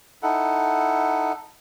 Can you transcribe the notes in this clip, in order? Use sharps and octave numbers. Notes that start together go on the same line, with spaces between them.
D#4 E4 A4 F#5